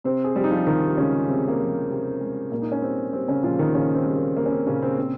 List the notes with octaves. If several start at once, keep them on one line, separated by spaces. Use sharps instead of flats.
C3 C4 C5
G#4
F3 G3 G4
D#4
F3 F4
C3 D#3 D#4
C#3 G#3 C#4
C3 C4
A#3
F3
C3
G#3
A#2 A#3
D#4
C#4
G3 C4
G3 C4
C#3 C#4
A#2 F3 F4
D#3 D#4
A#2 C#3 C#4
C4
G3
A#3
G3 A#3
C#4
C4
A#2 C#3 C#4
C4
C#3 C4